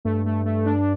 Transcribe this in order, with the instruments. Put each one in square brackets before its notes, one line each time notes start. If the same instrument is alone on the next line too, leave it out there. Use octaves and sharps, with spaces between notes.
[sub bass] G2 [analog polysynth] A3
[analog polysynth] A3
A3
D4